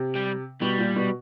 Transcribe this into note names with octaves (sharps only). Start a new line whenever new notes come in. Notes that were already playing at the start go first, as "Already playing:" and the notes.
Already playing: C3
G3
B2 G3
A#2
B2